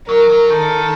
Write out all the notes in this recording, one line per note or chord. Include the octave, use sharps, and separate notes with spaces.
F#3 A#4
F#3
D#3 A4